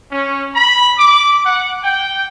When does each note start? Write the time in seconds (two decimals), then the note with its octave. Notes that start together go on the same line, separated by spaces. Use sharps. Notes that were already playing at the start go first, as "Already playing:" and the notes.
0.12 C#4
0.55 B5
0.98 D6
1.46 F#5
1.84 G5